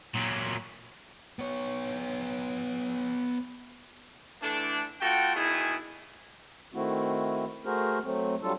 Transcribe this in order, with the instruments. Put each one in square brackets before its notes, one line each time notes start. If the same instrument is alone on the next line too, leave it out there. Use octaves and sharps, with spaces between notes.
[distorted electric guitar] A#2 F#3
[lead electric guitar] B3 C#5
[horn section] D3 E3 A3 D4
A3 F4 F#4 G5
B2 D#3 E4 G#4
[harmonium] D#3 A3 C4 E4 F#4
A3 F#4 G#4 A#4 C5
F#3 A3 C4
F#3 G3 D4 F4 A4